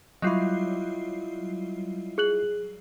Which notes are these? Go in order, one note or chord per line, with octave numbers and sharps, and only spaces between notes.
F#3 G3 E4 F4 D#5 C7
G#4 F#6 F#7